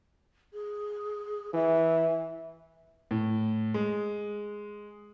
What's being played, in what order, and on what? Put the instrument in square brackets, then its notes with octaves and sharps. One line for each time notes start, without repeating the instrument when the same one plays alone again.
[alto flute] G#4
[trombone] E3 [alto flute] E5
[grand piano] A2
G#3